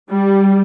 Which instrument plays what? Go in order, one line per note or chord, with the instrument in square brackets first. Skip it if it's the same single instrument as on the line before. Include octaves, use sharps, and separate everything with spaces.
[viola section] G3